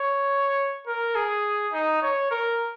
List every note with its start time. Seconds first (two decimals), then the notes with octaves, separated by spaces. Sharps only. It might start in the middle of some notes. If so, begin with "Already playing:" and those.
Already playing: C#5
0.87 A#4
1.15 G#4
1.73 D#4
2.02 C#5
2.31 A#4